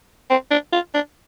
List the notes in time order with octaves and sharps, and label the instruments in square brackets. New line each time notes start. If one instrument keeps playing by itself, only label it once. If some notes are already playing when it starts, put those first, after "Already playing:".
[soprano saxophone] C4
D4
F4
D4